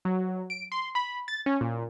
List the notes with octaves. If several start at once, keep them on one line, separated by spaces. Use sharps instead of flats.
F#3
D7
C6
B5
A6
C#4
A#2